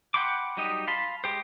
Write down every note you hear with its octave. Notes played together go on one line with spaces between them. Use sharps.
F#5 G5 B5 C6 D6
F#3 G3 D#4 G4 D#5
F5 A5 B5 C6
G#3 G4 C5